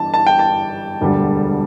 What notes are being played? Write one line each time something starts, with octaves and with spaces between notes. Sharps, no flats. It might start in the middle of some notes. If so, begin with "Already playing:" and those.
Already playing: G1 G2 E3 G3 A5
A5
G5
A5
E1 D2 D3 G3